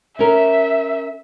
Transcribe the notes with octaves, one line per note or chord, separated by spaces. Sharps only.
C#4 A#4 E5